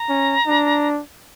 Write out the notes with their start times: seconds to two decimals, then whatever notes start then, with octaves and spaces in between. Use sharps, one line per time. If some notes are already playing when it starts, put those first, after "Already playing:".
Already playing: A#5
0.09 C#4
0.47 D4